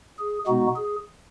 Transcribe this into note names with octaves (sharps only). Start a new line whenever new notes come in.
G#4
B2 G#3 B3 D#4 F#4
G#4